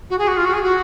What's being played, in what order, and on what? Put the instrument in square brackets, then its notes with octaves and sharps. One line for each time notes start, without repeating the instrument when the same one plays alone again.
[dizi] F#4
G#4
F#4
F4
F#4
G#4
F#4